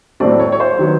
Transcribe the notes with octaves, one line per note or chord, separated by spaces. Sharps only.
A2 F#3 A3 C4 D5
C#5
C#5
C5
D#3 F#3 B3